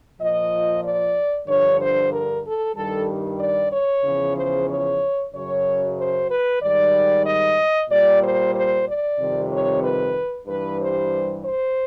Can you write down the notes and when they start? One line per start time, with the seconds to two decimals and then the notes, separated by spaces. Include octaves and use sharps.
0.19 A#2 F3 D#5
0.83 D5
1.47 G2 D3 F3 C#5
1.80 C5
2.12 A#4
2.44 A4
2.76 G2 D#3 G3 A4
3.40 D5
3.73 C#5
4.04 E2 C#3 F3
4.37 C5
4.68 C#5
5.33 F#2 C#3 F#3 C#5
5.97 C5
6.29 B4
6.62 G#2 D#3 G3 D5
7.26 D#5
7.90 A#2 G3 D5
8.22 C5
8.55 C5
8.87 D5
9.19 F2 C3 D#3 G3
9.51 C#5
9.84 B4
10.47 G2 E3 G3 B4
10.80 C5
11.44 C5